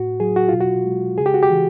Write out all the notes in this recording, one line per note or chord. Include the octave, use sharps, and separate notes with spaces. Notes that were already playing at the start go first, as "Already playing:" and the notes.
Already playing: A2 F#4
F#3 G#4
F#4
B2 F4
F#4
G#3
C#3 G#4
G4
F#4
G4
E3